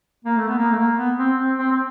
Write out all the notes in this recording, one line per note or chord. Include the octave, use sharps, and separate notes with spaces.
A#3
A3
B3
A#3
A3
A#3
B3
C4
C4
C4
C4